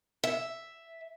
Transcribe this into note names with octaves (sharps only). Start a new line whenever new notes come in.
E5